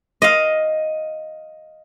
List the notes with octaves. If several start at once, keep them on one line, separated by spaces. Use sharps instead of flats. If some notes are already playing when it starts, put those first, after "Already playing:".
D#5 F5